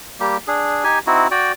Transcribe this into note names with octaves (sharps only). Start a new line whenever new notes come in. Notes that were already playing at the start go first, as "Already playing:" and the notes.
G3 A#3 G4
D4 G#4
D#4 G4 G#5
C4 D#4 E4 F#4
F#4 D5 G5